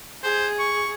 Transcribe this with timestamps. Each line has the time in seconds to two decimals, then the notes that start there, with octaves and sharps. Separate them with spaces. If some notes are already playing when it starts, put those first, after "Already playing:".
0.23 G#4 C5
0.59 C#6